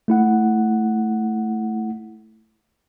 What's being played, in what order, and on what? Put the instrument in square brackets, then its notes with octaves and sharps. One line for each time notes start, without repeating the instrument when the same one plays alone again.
[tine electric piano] A3 E4 F#5